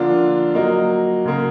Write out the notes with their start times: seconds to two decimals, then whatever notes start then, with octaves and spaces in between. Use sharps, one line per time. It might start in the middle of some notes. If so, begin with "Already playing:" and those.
Already playing: D3 F3 A#3 D4 F4
0.54 F#3 A#3 D#4
1.25 C#3 F#3 A#3